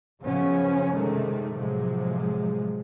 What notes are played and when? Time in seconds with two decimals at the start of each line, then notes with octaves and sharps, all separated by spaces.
0.23 F#2 C#3 F3 B3 C#4
0.95 C3 D#3 G#3 A3
1.55 A2 C3 F3 F#3 G#3